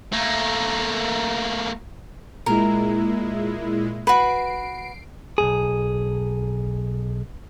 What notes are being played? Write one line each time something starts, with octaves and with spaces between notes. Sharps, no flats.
A3 A#3
A#2 G#3 E4 A#4
F#4 B4 C7 D7
B1 F#2 G#4